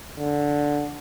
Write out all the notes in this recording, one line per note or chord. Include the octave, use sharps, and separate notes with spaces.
D3